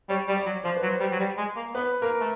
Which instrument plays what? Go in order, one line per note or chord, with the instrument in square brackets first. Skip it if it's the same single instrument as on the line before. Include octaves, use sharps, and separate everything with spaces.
[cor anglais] G3 [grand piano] C#5
[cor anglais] G3
[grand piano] D5
[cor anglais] F#3
[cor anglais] F3 [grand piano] C5
[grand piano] B4
[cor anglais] F#3
[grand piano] C5
[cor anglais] G3
F#3
G3
G#3
A#3
[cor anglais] B3 [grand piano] B4
[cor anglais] A#3 [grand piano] A#4
[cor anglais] A3